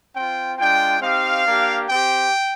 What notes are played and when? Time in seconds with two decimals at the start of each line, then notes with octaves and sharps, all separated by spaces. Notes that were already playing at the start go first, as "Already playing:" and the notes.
0.14 C4 F4 G5
0.58 G#3 D4 F4 G5
1.01 C4 D#4 G4 F5
1.45 A#3 D4 G4
1.88 C4 G4 G5